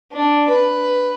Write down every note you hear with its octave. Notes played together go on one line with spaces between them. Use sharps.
D4
B4